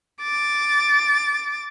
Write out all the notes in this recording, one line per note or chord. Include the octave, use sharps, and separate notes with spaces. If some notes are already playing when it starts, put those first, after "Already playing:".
D6 A6